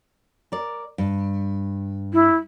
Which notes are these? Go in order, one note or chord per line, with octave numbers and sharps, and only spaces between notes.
A#4 D5
G2
E4